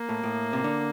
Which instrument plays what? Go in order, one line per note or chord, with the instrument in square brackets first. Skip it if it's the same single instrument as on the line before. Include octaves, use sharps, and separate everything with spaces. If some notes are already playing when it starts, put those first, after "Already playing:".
Already playing: [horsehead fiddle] A#3
[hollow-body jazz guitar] A2
A2
C3
D3